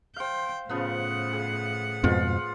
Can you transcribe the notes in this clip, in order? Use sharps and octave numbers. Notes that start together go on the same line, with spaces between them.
C5 F5 G5
A2 C#3 F3 B3 F#5
G#4
F2 G#2 B2 F4